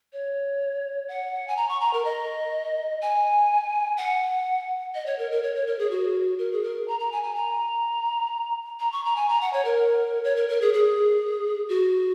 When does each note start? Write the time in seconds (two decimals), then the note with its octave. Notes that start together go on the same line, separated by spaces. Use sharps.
0.13 C#5
1.08 F#5
1.48 G#5
1.57 A#5
1.69 C#6
1.80 A#5
1.93 A#4
2.05 D#5
3.02 G#5
3.97 F#5
4.95 D#5
5.06 C#5
5.19 A#4
5.31 A#4
5.43 C#5
5.55 C#5
5.67 A#4
5.79 G#4
5.91 F#4
6.38 A#4
6.52 G#4
6.63 A#4
6.88 A#5
7.00 A#5
7.12 G#5
7.23 G#5
7.35 A#5
8.80 A#5
8.92 C#6
9.05 A#5
9.16 G#5
9.29 A#5
9.41 F#5
9.53 C#5
9.65 A#4
10.24 C#5
10.36 A#4
10.49 A#4
10.61 G#4
10.74 G#4
11.69 F#4